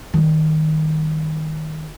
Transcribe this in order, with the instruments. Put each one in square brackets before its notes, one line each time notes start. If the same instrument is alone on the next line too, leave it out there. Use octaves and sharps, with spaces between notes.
[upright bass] D#3 G3